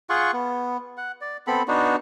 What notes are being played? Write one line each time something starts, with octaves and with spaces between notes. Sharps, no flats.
F4 G#4 F#5 C#6
B3
F#5
D5
B3 C4 A4 B5
B3 D4 D#4 F#4